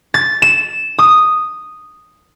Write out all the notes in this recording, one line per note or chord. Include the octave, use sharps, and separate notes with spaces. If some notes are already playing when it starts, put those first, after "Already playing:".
A6
E7
D#6